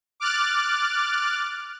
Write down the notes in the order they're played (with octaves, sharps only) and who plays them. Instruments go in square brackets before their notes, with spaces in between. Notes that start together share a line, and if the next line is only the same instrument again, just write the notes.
[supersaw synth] D6 F6 F#6 A6